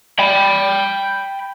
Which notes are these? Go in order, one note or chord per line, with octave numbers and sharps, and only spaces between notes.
G5 B5